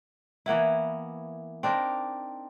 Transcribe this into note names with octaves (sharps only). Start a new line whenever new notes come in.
E3 A#3 B3 E4
C4 D4 D#4 A#4